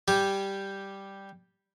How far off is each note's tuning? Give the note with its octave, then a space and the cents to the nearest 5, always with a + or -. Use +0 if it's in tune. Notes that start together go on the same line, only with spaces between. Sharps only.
G3 +0 G4 +0 G#5 +20